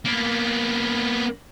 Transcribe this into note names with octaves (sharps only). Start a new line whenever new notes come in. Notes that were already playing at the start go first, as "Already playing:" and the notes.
A#3 B3